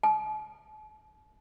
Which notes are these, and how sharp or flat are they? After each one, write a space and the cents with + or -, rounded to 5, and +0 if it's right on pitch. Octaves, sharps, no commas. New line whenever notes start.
A5 -45